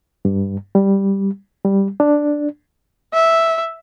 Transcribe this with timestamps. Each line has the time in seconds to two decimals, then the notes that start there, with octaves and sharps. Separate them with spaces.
0.25 G2
0.75 G3
1.65 G3
2.00 D4
3.13 E5